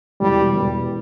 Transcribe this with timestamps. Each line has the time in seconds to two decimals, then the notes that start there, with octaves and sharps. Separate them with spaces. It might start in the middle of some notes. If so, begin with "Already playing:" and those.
0.20 E1 E2 B2 G3
0.53 E1 E2 B2